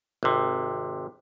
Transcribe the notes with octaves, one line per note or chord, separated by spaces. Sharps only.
G#1 C3